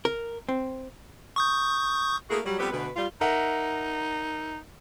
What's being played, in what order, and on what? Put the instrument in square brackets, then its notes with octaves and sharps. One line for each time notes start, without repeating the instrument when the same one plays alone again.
[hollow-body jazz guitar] A#4
C4
[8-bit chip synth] C#6 D#6 G6
[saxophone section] A3 A#3 E4 F#4 G#4
F#3 G3
F2 G3 B3 C4 G4 B4
D2 B2 B4
G3 F4
[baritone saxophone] D#4 [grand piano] A#4 E5 F#5